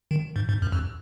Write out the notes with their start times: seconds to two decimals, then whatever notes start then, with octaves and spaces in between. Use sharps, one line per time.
0.11 D#3
0.36 G#2
0.49 G#2
0.62 F#2
0.72 F2